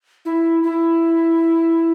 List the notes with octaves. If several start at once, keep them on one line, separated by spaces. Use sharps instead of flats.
E4
E4